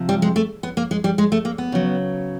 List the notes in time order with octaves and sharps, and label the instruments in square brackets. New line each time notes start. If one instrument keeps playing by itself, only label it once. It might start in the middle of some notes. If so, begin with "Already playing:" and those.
Already playing: [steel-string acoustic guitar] C3 F3
G3
G#3
A3
B3
A#3
G#3
G3
G#3
A3
A#3
B3
C#3 F#3